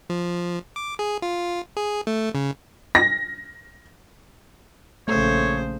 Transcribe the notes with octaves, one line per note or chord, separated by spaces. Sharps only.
F3
D6
G#4
F4
G#4
A3
C#3
A#6
A#1 C#3 A3 C5 C#5